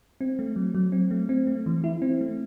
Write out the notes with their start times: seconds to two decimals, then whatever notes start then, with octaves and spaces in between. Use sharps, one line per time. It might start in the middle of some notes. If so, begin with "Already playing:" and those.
0.21 C4
0.39 A3
0.56 F#3
0.75 F#3
0.92 C4
1.11 A3
1.29 C4
1.47 A3
1.66 E3
1.84 E4
2.02 C4
2.21 A3